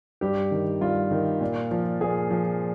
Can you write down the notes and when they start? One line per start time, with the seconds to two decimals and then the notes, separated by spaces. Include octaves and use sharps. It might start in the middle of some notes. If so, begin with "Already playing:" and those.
0.21 G2 G4
0.51 D#3
0.81 G2 F4
1.11 D#3
1.41 A#2
1.71 F3
2.01 A#2 G#4
2.31 F3